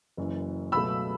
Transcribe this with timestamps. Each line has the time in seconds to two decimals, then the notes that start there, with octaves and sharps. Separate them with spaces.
0.17 F#1 F#2 E3
0.72 C#2 B2 F#3 A3 B5 E6